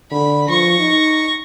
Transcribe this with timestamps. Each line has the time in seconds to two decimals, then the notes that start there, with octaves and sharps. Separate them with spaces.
0.11 D3 B5
0.49 F3 C#6 A#6
0.79 D#4